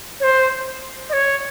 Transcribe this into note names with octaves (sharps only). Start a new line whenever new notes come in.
C#5
C5
D#5
C#5